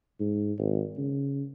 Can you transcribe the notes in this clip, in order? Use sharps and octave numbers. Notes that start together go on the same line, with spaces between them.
G#2
G#1
C#3